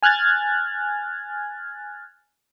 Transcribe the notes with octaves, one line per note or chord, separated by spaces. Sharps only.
G#5 F6 F#6 G#6 A6